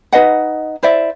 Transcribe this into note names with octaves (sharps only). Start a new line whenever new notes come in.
D#4 B4 D#5 F#5
E4 C5 D5 E5